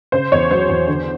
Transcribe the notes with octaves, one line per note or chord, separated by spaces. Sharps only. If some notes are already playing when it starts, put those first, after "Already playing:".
C#3 C5
E2 C#5
F#3 C5
E2
D3